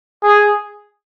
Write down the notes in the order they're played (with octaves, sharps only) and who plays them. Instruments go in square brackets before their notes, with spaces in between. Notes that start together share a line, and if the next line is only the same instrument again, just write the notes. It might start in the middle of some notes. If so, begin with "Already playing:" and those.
[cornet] G#4